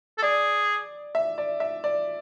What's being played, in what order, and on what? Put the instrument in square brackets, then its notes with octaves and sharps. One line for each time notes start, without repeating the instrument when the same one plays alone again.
[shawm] A4
[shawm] G#4 [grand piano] D5
[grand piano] E5
D5
E5
D5